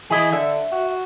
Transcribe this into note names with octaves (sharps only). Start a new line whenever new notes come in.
E3 E4 G#4 D#5
D3 E5
F#4